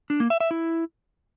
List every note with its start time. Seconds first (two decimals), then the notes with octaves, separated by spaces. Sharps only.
0.10 D4
0.20 A#3
0.30 E5
0.40 E5
0.51 E4